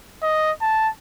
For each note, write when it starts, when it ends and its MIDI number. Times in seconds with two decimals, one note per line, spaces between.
0.23 0.51 75
0.61 0.89 81